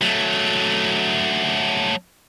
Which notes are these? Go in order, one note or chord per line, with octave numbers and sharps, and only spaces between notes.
F#3 A3